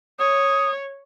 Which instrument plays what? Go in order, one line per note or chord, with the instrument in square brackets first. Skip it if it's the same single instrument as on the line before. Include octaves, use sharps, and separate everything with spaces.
[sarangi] C#5 [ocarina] D#6